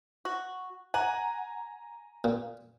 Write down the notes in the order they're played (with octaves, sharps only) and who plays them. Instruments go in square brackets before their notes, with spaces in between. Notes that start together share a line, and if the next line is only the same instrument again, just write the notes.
[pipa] F#4
[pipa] F#5 [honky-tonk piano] G#5 A#5
[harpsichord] A#2